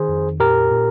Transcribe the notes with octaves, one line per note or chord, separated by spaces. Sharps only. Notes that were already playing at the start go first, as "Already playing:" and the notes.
Already playing: D#3 G#4 C5
F2
A#2 G4 A#4
A#2